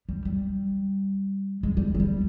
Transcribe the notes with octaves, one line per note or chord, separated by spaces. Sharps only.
G3
G3
G#3
G3
G#3
G3